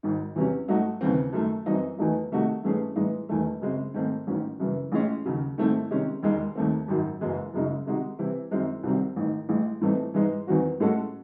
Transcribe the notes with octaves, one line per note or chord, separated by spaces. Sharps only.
G#1 G#2 D#3
E2 C3 F#3 C#4
G#2 F#3 A3 D#4 F#4
D#2 C#3 E3 C4
F#2 D#3 A3
F#2 E3 C4 D#4
E2 D#3 F#3 A3 D#4
C3 D#3 A3 D#4 F#4
G#2 E3 A3 C#4 G#4
A2 E3 G#3 D#4
E1 E2 D#3 A3
F#2 C#3 G#3 C4
G#2 D#3 A3 C4
A1 G#2 D#3 F#3 C#4
F#2 C#3 E3
A1 A2 G#3 C#4
D#2 C#3 F#3
G#2 D#3 A3 C4 E4
C3 D#3 G#3 C#4
E1 D#2 D#3 G#3
D#2 D#3 A3 C4
G#1 F#2 D#3 F#3
F#1 F#2 E3 G#3
F#1 F#2 C#3 G#3 D#4
C3 D#3 G#3 D#4 F#4
C3 E3 C4 E4
F#2 D#3 G#3 C4 E4
C2 C3 D#3 F#3 C4
A1 G#2 D#3
A1 A2 G#3
A2 E3 A3 C4 D#4
G#2 E3 G#3 D#4
E2 D#3 F#3 C4 F#4
A2 G#3 C#4 F#4 A4